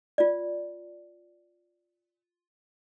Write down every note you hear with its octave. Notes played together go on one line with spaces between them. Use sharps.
F4 D5